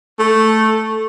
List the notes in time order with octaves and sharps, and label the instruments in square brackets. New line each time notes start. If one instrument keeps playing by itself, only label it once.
[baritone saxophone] A3